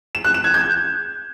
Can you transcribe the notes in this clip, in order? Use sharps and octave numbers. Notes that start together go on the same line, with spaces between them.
E7
F#6
E7
G#6
G6